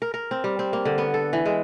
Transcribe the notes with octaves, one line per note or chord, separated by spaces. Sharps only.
A#4
A#4
C4
G3
C4
A#3
D3
B3
A4
E3
G#3